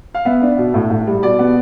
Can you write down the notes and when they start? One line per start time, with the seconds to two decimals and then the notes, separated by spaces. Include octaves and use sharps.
0.15 F5
0.25 B3 E5
0.42 D4
0.58 B2
0.74 A2
0.90 A2
1.07 G3
1.23 B2 D5
1.39 B3